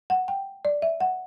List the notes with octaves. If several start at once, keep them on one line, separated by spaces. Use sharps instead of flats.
F#5
G5
D5
E5
F#5